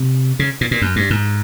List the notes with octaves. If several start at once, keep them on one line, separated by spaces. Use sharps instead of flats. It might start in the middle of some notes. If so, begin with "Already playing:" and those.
Already playing: C3
C#3
A#2
A#2
F#2
G2
G#2